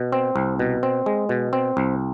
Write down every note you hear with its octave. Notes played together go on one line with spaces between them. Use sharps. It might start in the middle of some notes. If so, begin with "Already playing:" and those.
Already playing: B2
C4
C2
B2
C4
G#3
B2
C4
C2